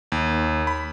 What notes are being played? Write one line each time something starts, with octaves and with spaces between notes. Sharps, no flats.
D#2
B5